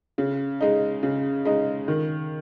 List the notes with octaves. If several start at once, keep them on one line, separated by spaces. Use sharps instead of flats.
C#3
G#3 D#4
C#3
G#3 D#4
D#3